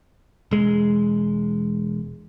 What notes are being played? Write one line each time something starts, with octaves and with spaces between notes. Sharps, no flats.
E1 G#3